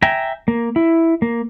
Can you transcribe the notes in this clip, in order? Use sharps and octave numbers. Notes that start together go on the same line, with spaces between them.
E5 G5 G#5 A#5
A#3
E4
A#3